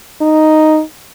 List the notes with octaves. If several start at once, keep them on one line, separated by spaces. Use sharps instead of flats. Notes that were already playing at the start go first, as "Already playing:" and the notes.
D#4